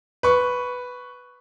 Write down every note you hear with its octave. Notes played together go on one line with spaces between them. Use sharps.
B4 C#6